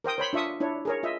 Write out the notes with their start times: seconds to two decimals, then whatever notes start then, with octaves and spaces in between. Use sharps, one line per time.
0.04 A#4 C5 G5 D#6
0.18 C5 C#5 B5 C6
0.33 D4 F4 E5 C#6 D#6
0.60 D4 E4 C#5
0.85 G#4 A#4 C#5
1.03 F4 D#5 E5